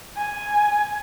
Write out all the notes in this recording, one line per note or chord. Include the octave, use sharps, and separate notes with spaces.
G#5